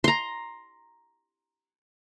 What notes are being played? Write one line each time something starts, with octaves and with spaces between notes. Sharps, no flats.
A#5 C6